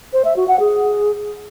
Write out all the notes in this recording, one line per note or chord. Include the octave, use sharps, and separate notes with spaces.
C5
E5
F#4
F#5
G#4